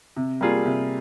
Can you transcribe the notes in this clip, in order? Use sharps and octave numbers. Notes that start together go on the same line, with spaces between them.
C3
G3 A#3 F4 G#4
C3